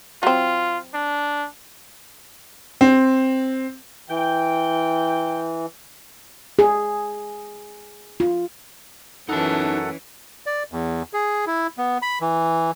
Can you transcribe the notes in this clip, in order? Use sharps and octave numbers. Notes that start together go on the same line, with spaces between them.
F#3 C4 F4
D4
C4
E3 G5
G#4
F4
F#2 E3 C#4 D#4 A4 F#5 A5
D5
E2
G#4
E4
B3
B5
E3